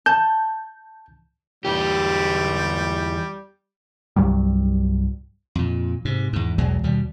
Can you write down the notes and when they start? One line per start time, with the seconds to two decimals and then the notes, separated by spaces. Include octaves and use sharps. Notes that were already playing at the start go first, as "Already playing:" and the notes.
0.06 A5 G6
1.65 E2 G3 G4
4.16 C2 G2 F#3 G3
5.55 F2 A#2
6.05 G#2 C3
6.33 E2 G#2
6.58 B1 E2 F#3 G#3
6.83 D#2 B2 G3